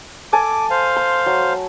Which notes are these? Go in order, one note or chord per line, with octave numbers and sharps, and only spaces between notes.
A4 G#5 A5 D6
C5 F5
C6
F#3